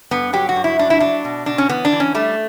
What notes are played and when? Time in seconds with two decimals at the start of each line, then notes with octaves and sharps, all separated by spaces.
0.11 G2 B3
0.33 F#3 G4
0.49 F#4
0.56 G2
0.64 E4
0.79 F#3 D4
0.90 E4
1.00 F#3 D4
1.25 B2
1.46 B2 D4
1.58 C#4
1.69 E3 B3
1.85 D4
1.92 E3
2.00 C#4
2.14 G3 A3